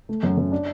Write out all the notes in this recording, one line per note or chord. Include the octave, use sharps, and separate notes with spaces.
A3
F#2
F#2
D4